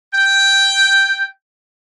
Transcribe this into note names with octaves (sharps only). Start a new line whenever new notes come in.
G5